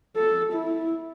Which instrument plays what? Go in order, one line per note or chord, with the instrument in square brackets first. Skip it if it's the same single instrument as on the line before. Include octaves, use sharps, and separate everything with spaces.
[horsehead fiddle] A4
E4